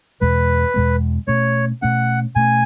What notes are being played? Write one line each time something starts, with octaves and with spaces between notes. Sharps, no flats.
E2 B2 G#3 B3 B4
E2 B2 G#3 B3
B2 A3 C#4 C#5
B2 A3 C#4 F#5
B2 A3 C#4 G#5